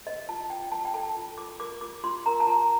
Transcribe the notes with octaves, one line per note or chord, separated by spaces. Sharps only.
C5 D#5
F4 A5
F4 G5
F4 A5
G5
A4 A5
F4
F4 D6
A#4 D6
F4 D6
F4 C6
A#4 A#5
A5
F4 A#5